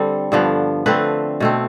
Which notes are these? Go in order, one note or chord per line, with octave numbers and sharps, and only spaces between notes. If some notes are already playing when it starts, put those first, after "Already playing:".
Already playing: D3 G3 C4 A4
G2 D3 F3 B3
D3 A3 C4 B4
B2 A3 C4